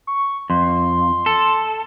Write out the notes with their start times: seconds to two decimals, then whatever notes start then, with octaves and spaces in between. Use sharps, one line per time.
0.07 C#6
0.50 F2 C6
1.26 A4